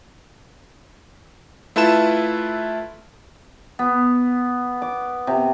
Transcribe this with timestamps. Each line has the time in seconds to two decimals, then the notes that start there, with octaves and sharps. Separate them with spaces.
1.76 A3 E4 F4 B4 A5 E7
3.79 B3
4.82 D6
5.27 C3